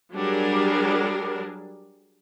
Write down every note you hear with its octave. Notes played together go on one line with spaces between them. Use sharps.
F#3 G3 D4 G#4 A#4